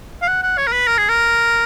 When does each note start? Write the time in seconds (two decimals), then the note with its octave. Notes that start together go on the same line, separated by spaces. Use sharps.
0.22 F5
0.28 F#5
0.43 F#5
0.58 C#5
0.67 A#4
0.73 B4
0.87 A#4
0.98 G#4
1.09 A#4